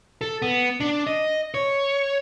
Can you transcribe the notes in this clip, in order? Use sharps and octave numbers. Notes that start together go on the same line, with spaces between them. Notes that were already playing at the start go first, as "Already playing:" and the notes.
A4
B3
D4
D#5
C#5